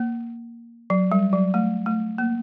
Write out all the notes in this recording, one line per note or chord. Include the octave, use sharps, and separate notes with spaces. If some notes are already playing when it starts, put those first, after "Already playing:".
Already playing: A#3
F#3
G3
F#3
A3
A3
A#3